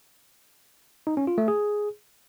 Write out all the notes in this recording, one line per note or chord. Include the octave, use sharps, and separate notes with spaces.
D#4
C#4
F4
A3
G#4